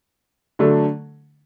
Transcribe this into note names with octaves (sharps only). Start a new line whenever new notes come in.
D3 F#3 A3 D4